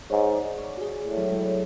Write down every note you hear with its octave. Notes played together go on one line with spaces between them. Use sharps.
G#2 C#5
D5
C#5
F#4
G#4
A2
F#3
G#3